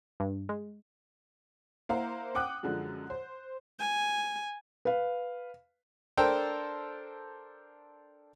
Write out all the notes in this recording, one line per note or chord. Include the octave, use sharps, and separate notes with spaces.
G2
G#3
A#3 E4 C5 F5 F#5 A#5
F#5 G5 D6 D#6 F#6
F#2 D3 F3 G#3
C5
G#5
B4 F5
D4 A4 A#4 C5 G5